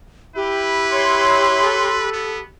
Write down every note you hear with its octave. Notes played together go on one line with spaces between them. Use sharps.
E4 G4 B4
C#5 C6
A4
B3